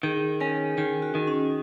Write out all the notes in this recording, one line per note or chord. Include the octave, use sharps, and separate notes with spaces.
D#3 G#4
C#4 A#4
D#3 G#4
F#4
D#3
C#4